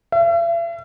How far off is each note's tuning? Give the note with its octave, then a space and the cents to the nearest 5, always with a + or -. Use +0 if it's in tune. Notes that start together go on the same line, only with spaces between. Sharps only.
E5 +45